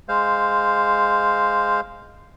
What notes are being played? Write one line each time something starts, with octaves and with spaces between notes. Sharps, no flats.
G#3 C5 F5